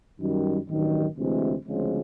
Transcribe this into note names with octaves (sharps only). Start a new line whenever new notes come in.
F#2 D#3 G3
A1 G2 D#3 F#3
D2 C3 E3 G#3 C4
D2 C#3 F3 G#3 C4